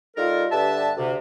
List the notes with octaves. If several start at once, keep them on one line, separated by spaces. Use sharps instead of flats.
G3 D#4 F4 A4 A#4
G2 D3 G4 B4 E5 A5
D2 C3